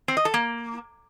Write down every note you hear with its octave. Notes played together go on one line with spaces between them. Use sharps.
C4
D#5
A4
A#3